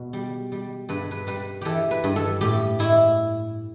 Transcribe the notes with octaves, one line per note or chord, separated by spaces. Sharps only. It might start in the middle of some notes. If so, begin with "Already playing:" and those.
Already playing: B2 B4
G3
G3
G2 B4
B4
G3 B4
E3 G4 A4
B4
G2
A4
A2 G4
A2 E4